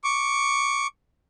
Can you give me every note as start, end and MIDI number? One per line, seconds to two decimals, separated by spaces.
0.04 0.87 85
0.04 0.87 86